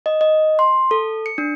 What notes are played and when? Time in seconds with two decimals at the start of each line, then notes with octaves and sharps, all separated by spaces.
0.06 D#5
0.21 D#5
0.59 C6
0.91 A4
1.26 C#7
1.38 D4